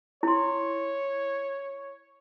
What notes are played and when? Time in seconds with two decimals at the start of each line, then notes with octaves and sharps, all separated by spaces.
0.23 E4 C#5 C6